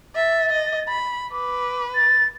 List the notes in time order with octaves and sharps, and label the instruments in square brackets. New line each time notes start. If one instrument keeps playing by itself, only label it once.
[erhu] E5 [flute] A6
[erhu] D#5
B5
[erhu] B4 [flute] D6
[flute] A6